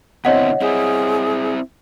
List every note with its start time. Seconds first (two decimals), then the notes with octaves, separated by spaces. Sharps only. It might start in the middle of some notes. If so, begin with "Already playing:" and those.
0.25 B2 D3 C4 E4 C#5 D#5 F#5
0.61 C4 E4 G#4